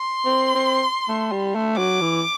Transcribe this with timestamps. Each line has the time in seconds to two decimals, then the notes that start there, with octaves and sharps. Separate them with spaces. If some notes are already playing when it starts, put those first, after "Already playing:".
Already playing: C6
0.25 C4
0.55 C4
1.08 A3
1.32 G3
1.55 A3
1.77 F#3 D6
2.01 E3